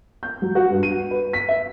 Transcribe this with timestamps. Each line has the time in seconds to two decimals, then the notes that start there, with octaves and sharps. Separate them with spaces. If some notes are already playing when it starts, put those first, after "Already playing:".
0.23 G6
0.42 F#3
0.55 F#4
0.71 G2
0.83 D#7
1.11 B4
1.33 B6
1.49 E5